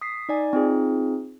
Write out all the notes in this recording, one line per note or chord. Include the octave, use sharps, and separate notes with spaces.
D#6 B6 C7
D#4 D5 G#5
C4 D#4 F4 G#4